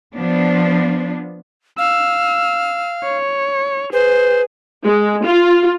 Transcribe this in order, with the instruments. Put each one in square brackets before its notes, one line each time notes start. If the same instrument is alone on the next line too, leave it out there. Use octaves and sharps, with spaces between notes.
[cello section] F3 B3 D4
[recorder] F5 [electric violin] E6
[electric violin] C#5
[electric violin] G#4 [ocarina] B4 [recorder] C5
[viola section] G#3
F4